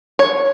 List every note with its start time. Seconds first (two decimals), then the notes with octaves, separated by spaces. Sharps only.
0.19 C#5